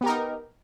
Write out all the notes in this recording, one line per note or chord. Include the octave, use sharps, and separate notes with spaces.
B3 D#4 G4 A#4